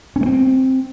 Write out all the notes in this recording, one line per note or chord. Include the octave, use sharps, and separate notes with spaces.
C#4
A3
C4